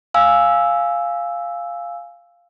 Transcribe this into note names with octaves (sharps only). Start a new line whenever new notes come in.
F5 G#5 E6